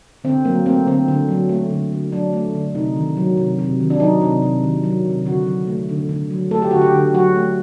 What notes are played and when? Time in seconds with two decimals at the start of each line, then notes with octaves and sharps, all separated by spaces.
0.24 D3 C4
0.45 F#3 A#3
0.66 A3 C4
0.87 D3 C4
1.08 D3
1.29 F#3
1.49 A3
1.70 D3
1.92 D3
2.12 F#3 D4
2.33 A3
2.55 D3
2.75 C3 D#4
2.96 D#3
3.17 F#3
3.37 C3
3.59 C3
3.80 D#3
3.90 D4
4.00 F#3 D#4
4.21 C3
4.42 C3
4.64 D#3
4.83 F#3
5.05 C3
5.25 D3 F#4
5.47 F#3
5.67 A3
5.89 D3
6.09 D3
6.31 F#3
6.51 A3 A4
6.62 G4
6.71 D3 F#4
6.82 G4
6.93 D3
7.14 F#3 F#4
7.35 A3